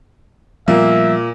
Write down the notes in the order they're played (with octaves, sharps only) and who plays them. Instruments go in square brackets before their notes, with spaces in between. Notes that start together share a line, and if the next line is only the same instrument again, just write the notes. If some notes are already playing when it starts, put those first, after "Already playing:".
[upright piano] A#2 A#3 [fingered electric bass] F3 G3 B3 [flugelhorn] E5